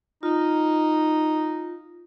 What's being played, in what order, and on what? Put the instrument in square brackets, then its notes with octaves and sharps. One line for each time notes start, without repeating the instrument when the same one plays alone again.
[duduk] D#4 [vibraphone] F4